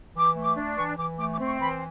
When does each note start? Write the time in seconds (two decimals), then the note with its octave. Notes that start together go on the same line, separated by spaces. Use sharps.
0.15 E3 D6
0.35 A3
0.42 D6
0.56 D4
0.76 E3 C#6
0.97 E3 D6
1.18 A3 D6
1.33 D6
1.39 C4
1.46 C#6
1.60 E3 B5